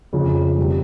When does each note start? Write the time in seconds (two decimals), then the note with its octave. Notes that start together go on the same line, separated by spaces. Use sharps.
0.13 F2 C#3 F3 C#4
0.57 C3 G3